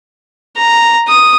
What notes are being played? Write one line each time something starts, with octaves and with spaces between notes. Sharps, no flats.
A#5
D#6